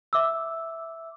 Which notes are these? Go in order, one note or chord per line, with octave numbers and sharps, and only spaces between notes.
E5 D6 E6